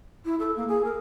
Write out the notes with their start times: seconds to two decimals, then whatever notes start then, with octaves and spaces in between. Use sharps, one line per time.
0.25 E4
0.39 A4
0.56 A#3
0.68 G#4
0.84 A#4